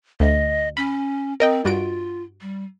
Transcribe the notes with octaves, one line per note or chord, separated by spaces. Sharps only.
D2 D#5
C#4 B5
C4 A#4 D#5 G5
G2 F4 F#4 D7
G3